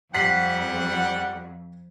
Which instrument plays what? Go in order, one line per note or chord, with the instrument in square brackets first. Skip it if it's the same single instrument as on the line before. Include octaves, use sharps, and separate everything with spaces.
[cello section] F2 [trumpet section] G3 F#5 [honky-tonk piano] B6 C7 F#7